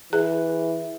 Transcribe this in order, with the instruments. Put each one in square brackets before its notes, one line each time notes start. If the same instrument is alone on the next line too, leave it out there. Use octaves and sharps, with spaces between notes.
[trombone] E3 [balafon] G#4